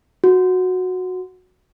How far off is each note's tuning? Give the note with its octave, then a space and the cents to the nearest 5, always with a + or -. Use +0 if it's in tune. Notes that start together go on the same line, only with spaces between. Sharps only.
F#4 -10